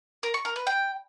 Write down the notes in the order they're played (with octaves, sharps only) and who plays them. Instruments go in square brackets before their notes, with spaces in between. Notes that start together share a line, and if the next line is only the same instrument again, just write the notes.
[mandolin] A#4
C#6
A#4
B4
G5